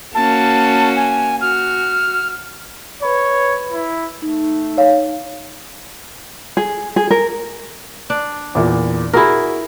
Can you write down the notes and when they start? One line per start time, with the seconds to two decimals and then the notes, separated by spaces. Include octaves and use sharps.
0.15 A#3 C#4 F#4 A5
0.96 G#5
1.41 F#4 F6
3.02 B4 C#5 B5
3.72 E4
4.22 A3 D#4
4.78 C#5 F5
6.57 G#4
6.96 G#4
7.11 A#4
8.10 D4
8.55 E2 A#2
9.13 E4 F#4 G#4 A#4